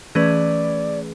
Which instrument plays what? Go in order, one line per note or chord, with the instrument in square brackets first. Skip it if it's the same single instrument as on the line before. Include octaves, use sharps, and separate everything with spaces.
[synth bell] E3 A3 C#4 G#4 B4 [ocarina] D5